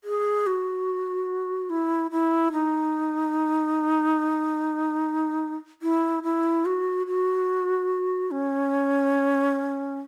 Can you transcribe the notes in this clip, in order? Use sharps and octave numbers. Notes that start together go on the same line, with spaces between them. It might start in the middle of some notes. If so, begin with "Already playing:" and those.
G#4
F#4
E4
E4
D#4
E4
E4
F#4
F#4
C#4